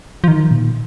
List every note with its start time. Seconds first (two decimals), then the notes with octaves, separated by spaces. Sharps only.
0.24 F3
0.28 D#3
0.51 A#2